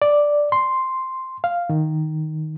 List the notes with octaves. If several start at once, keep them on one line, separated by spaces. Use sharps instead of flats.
D5
C6
F5
D#3